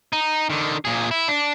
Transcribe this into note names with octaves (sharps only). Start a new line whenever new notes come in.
D#4
D3 D#3
A#2 G#4
E4
D4